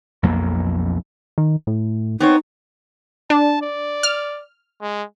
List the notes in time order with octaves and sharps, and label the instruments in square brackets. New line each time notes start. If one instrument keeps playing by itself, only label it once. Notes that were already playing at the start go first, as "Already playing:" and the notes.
[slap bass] B1 F2 A#3
[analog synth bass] D#3
A2
[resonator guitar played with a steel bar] B3 C4 C#5 [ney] D#4
[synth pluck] D4 [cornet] A5
[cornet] D5
[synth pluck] F6
[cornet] G#3